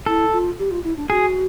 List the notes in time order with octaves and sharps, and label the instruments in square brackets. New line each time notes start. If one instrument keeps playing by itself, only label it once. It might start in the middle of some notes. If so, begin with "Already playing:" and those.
[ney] E4 [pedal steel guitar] A4
[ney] F4
G4
F4
E4
D4
[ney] F#4 [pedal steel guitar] G#4